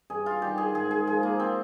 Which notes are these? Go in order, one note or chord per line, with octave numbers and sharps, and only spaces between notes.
G2 G#4
F4
D#3 G3 G4
G#4
G#2 G#4
G#4
F3 G#4
A#3
C4